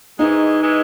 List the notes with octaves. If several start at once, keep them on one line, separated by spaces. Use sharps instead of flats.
G#2 E3 G#3 D#4
E3 G#3